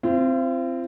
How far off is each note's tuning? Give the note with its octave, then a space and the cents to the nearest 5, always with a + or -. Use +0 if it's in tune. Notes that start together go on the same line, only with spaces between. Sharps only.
C4 -5 F4 -45